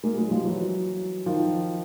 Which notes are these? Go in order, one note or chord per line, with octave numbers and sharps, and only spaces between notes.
G#3 A#3
F#3 G#3
F3 G3
E3 F#3
D#3 F3